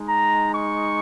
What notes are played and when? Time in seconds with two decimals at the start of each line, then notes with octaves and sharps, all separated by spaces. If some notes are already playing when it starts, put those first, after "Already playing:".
Already playing: G#3 D#4
0.09 A#5
0.54 C#6